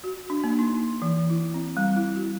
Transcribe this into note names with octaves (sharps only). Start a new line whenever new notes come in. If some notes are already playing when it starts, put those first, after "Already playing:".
F#4
D4
A#3
D#4
E3
E4
C4
G3
E4
F#4